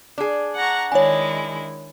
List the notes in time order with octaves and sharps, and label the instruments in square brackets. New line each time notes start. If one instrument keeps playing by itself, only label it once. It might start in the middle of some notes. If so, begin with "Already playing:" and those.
[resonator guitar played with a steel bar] D4 G#4
[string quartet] F#5 A#5 C#6
[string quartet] D#3 G#3 E4 [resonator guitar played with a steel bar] D4 [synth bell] C#5 G#5